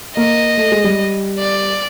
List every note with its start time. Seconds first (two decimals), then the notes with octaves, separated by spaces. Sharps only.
0.16 A#3 D#5
0.57 A3
0.72 G#3
0.84 G3
1.39 D5